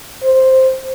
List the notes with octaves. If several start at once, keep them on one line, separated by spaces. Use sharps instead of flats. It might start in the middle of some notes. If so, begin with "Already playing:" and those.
C5